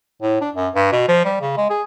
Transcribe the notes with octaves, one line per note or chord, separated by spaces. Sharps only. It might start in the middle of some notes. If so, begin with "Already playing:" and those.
A2
D4
F#2
G2
B2
F3
G3
C#3
G#3
G#4